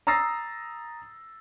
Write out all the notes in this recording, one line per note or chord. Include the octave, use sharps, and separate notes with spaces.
A#5 D#6 E6 A6 A#6 C7